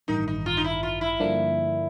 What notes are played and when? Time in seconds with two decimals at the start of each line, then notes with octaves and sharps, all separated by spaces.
0.08 A1 G2 D#3 D#4
0.28 D#4
0.46 F4
0.57 D#4
0.65 E4
0.83 F4
1.01 E4
1.20 G2 D3 F3 A#3 D4